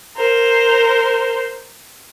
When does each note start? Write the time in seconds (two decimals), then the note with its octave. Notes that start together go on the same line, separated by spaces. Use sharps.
0.16 A#4 C5